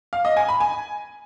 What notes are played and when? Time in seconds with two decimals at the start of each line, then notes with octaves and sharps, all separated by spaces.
0.13 F5
0.25 D#5
0.37 G#5
0.48 B5
0.60 G#5